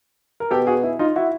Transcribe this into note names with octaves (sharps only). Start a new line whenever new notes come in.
A#4
B2 G4 A4
F#4 G#4
E4
D#4 F4
E4 F#4